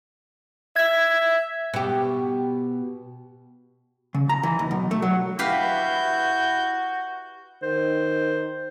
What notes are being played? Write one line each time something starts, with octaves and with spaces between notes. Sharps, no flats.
E5 G#6
B2 G4
C#3
A#5
E3
D#2
B1
A3
F#3
E4 F#4 G4 B4 F5 G6
D#3 C5